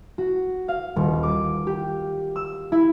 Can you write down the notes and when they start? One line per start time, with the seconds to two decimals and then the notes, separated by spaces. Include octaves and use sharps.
0.18 F#4
0.68 F5
0.96 D#1
1.23 D6
1.67 G4
2.36 E6
2.72 E4